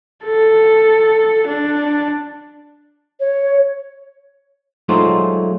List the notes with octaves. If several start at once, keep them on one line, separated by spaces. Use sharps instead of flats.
A4
D4
C#5
F#3 G#3 A3 D#4 F4 C5